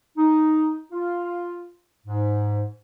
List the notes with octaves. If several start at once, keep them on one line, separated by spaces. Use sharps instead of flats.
D#4
F4
G#2